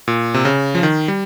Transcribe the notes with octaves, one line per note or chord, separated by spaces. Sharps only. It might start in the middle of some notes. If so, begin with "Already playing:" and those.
A#2
C3
C#3
F3
D#3
G3